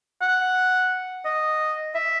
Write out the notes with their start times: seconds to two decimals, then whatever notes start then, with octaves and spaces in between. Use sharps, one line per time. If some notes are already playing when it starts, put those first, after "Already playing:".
0.21 F#5
1.25 D#5
1.95 E5